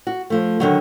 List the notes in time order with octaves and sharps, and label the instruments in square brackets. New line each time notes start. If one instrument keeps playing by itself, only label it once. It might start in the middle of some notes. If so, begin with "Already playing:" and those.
[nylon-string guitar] F#4
F3 A3
D3 D#3 F#3